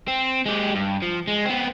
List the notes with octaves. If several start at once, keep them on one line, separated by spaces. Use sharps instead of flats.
C4
G#3 G4
G2
F3
G#3
B3 C4